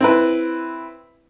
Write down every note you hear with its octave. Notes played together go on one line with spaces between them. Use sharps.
C4 E4 B4